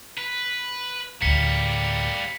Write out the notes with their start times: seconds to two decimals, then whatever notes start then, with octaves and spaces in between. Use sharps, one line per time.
0.17 B4
1.22 D2 A2 G3 A#3 B6 C#7